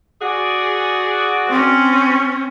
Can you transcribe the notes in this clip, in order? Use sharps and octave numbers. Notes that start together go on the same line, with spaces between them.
F#4 G#4 D5
C4 C#4